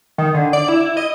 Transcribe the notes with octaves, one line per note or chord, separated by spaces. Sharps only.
D#3
D3
D5
E4
D#5